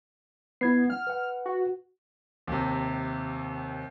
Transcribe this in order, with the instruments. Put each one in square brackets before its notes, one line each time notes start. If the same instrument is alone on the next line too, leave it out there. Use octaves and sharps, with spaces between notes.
[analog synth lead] B3 [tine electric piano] E4 G#6 C7
[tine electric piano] F#5 [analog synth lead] F6
[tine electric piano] B4 F#5
[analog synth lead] F#4
[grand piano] D#2 C3